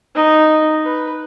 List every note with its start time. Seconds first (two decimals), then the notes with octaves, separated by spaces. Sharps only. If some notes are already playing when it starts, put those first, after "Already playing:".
0.15 D#4
0.84 B4